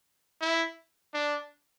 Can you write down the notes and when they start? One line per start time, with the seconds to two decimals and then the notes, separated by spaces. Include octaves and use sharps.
0.41 E4
1.14 D4